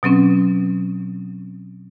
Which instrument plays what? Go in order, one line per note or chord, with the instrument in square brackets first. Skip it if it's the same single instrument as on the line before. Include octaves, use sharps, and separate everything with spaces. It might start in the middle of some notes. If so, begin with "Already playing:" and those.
[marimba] B2 F#3 C4 C#4